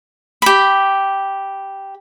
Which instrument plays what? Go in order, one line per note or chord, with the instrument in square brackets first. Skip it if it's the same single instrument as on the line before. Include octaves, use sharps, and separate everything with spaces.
[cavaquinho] G4 B5